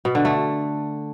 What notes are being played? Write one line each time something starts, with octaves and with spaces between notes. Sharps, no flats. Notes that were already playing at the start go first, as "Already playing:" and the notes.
B2
D3
A3